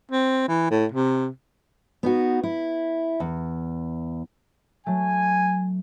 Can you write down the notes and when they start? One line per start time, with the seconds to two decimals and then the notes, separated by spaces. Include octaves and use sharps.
0.11 C4
0.48 E3
0.71 A2
0.92 C3
2.03 B3 D#4 F#4
2.43 E4
3.20 E2
4.86 F#3 A3 G#5